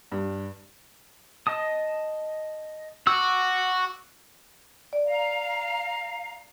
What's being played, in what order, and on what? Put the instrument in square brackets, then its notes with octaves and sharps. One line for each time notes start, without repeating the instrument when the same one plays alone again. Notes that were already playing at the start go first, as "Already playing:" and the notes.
[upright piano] G2
[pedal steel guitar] D#5 A5 D#6
[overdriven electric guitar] F#4 [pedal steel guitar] D6 E6
[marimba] D5
[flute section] F5 A#5